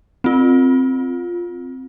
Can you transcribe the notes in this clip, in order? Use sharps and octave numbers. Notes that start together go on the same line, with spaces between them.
C4 F4